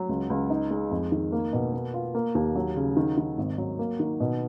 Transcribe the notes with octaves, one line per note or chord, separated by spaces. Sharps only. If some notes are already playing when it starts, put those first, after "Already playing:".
Already playing: F#3
C#2
C#2
D#4
G#3
F2
D#3
A#3
B2
B3
F4
A#3
D#2
F#3
C#3
D#3
D#3
G#1
F#3
A#3
D#3
B2